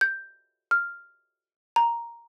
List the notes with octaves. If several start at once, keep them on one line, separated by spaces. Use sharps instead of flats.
G6
F6
A#5